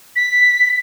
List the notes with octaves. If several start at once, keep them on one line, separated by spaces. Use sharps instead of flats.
B6